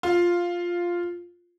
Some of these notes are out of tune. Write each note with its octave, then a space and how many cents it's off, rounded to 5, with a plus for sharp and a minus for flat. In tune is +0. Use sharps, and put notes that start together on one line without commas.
F4 +0